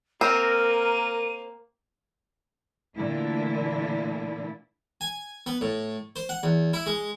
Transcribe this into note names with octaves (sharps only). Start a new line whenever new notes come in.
A#3 C4 A#4 D#7
A#2 D3 E3 A3 D4 E4
G#5
B3
A2
C5
F#5
E2
E4
G#3